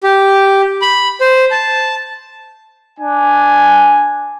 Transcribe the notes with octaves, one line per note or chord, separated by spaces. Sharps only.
G4
B5
C5
A5
D4 G#5